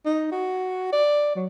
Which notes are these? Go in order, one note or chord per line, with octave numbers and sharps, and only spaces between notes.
D#4
F#4
D5
F#3